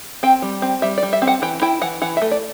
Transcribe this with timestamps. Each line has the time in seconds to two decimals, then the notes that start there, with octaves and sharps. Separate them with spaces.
0.23 C4 G5
0.42 G3
0.62 C4
0.82 G3 E5
0.98 D5
1.03 G3
1.13 E5
1.22 C4
1.27 F#5
1.42 E3 G5
1.62 E4 G5
1.82 E3 F#5
2.02 E3 F#5
2.17 E5
2.22 A3
2.31 D5